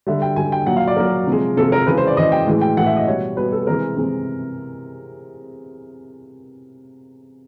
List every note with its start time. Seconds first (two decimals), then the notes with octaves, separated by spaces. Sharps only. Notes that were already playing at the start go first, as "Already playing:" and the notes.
0.07 D3 G3 E5
0.22 G5
0.36 D3 G3 G#5
0.52 G5
0.67 A#2 F#3 F#5
0.77 F5
0.87 D5
0.96 A#2 F#3 A#4
1.27 C3 F3 G#3
1.57 C3 F3 G#3 A4
1.72 A#4
1.87 C#3 E3 G#3 B4
1.98 C5
2.07 D5
2.17 C#3 E3 G#3 D#5
2.32 G5
2.47 A2 E3 G#3
2.61 G5
2.77 A2 E3 G#3 F#5
2.86 E5
2.96 D#5
3.07 B2 G3 C#5
3.37 B2 G3 B4
3.52 A4
3.67 C3 E3 G#3 A#4
3.97 C3 E3 G#3